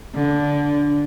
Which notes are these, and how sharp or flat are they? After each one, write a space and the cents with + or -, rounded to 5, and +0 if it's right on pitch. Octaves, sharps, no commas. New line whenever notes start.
D3 -10